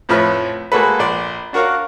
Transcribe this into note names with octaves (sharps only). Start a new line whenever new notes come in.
F2 A2 F3 B4 F6
G#3 A#3 F#4 A4 B4
A#1 D5 C6
D4 F#4 A#4 C#5 F5